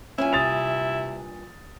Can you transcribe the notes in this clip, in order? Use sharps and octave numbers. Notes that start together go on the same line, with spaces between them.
G2 A#2 C#4 E4 G#5
C3 D#6 A6 F7